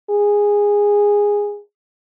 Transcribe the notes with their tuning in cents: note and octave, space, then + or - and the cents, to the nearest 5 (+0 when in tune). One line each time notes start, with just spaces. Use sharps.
G#4 -15